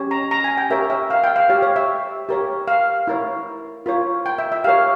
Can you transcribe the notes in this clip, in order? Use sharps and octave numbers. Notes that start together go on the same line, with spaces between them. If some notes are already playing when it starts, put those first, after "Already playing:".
Already playing: C#4 G4 C#5
A#5
A#5
G#5
G5
G4 A#4 C#5 E5
E5
F5
G5
F5
G4 C#5
C#5
E5
G4 A#4 C#5
F5
E4 A#4 C#5
F4 A#4 C#5
G5
E5
E5
G4 A#4 C#5 F5